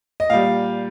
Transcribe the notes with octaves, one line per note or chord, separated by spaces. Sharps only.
D#5
A#2 G3 F5